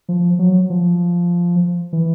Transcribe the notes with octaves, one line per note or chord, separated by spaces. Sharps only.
F3
F#3
F3
E3